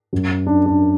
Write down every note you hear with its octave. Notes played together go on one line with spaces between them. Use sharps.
F#2 F#3
D4
D4